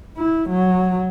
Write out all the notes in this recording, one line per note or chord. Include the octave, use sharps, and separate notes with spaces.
E4
F#3